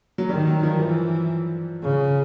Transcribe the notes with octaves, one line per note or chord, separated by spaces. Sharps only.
F#3
D#3 G3
F#3
F3
E3 F3
C#3